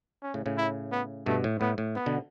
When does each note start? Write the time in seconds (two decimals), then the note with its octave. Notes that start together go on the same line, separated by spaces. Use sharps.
0.23 C#4
0.34 A2 C#3
0.46 A2 C#3
0.58 E4
0.92 B3
1.26 G2 B2 A3
1.44 A2
1.60 A2 B3
1.78 A2
1.96 B3
2.06 B2 D3